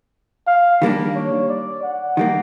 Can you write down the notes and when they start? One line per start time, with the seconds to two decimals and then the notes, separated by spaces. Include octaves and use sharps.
0.48 F5
0.82 D#3 G3 A#3 D4
1.16 C#5
1.49 D5
1.83 F#5
2.17 D#3 G3 A#3